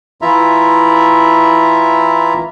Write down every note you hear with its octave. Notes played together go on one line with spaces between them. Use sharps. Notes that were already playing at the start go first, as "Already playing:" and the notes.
E3 E4 F4 E5 A#5